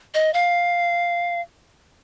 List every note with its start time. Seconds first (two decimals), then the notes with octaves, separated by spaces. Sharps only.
0.14 D#5
0.34 F5